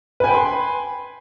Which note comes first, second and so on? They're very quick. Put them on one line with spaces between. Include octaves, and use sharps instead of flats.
B4 G#5 G5 B5 C6